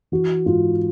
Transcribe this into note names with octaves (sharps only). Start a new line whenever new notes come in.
E3 F#4
G#2 F4